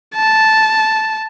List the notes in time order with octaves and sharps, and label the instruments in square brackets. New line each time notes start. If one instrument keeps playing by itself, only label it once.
[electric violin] A5